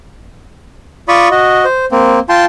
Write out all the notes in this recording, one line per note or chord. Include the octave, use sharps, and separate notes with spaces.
F4 D5 B5 C#6 D#6
F#4 D#5
C5
A#3 C4
F4 G5 A5 C6